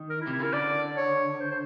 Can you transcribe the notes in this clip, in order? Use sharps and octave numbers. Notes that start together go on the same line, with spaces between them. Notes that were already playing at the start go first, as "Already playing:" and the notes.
Already playing: D#3
A#4
E4
C3
E4
C#3 A#4
D3 D5
C#5
C5
C5